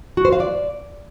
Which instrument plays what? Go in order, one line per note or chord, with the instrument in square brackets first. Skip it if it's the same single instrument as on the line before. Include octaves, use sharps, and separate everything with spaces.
[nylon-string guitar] F#4
C5
F5
D5